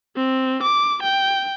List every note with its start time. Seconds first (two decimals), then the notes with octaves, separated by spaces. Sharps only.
0.16 C4
0.63 D6
1.03 G5